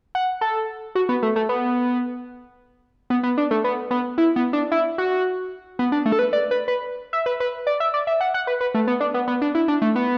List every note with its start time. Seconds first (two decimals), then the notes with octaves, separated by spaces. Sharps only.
0.15 F#5
0.41 A4
0.95 F#4
1.09 B3
1.23 A3
1.36 A3
1.49 B3
3.10 B3
3.23 B3
3.38 D4
3.51 A3
3.64 B3
3.91 B3
4.18 E4
4.36 B3
4.53 D4
4.72 E4
4.98 F#4
5.79 B3
5.92 D4
6.06 A3
6.12 A4
6.19 B4
6.33 D5
6.51 B4
6.68 B4
7.13 E5
7.26 B4
7.40 B4
7.67 D5
7.80 E5
7.94 D5
8.07 E5
8.21 F#5
8.34 F#5
8.47 B4
8.61 B4
8.75 A3
8.87 B3
9.00 D4
9.14 B3
9.28 B3
9.42 D4
9.55 E4
9.68 D4
9.82 A3
9.96 B3